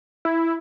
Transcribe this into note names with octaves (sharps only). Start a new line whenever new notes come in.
E4